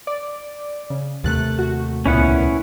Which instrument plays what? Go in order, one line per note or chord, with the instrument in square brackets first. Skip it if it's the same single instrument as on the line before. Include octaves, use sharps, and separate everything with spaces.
[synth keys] D5
C#3
[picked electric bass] D#2 C3 A3 [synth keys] F#6 A6
[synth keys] F#4
[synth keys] C#2 A#2 B3 [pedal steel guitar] C#4 E4 F#5